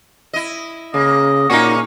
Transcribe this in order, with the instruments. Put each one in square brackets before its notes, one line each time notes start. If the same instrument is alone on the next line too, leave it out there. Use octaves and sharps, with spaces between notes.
[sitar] E4 D#5
[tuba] C#3 [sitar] A#3 [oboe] D#5
[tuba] A#2 [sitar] A#3 C#4 G#4 [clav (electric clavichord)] D#4 F#4 [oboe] C#6